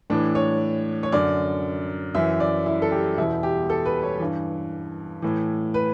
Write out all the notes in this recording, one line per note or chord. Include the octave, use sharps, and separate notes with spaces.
A2 E3 D4
C#5
C#5
F#2 D3 D5
F#2 E3 E5
D5
E4
A4
G4
E2 B2 E4
G4
A4
B4
C#5
G2 E3
A2 E3
B4